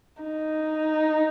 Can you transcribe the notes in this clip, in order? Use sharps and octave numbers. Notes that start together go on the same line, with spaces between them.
D#4